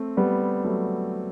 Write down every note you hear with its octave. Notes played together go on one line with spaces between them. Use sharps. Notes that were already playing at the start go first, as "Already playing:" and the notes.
Already playing: A3 C4
G3 B3
F#3 A3